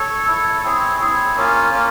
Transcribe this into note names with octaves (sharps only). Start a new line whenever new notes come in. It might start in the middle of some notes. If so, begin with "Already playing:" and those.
Already playing: A4 C#5
E4 A4 C#5
C4 E4 G#4 C#5
C4 E4 G#4 C#5
A#3 C#4 F4
A#3 C#4 F4